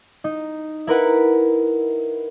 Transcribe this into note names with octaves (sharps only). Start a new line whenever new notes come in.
D#4
E4 A#4 B4 F#5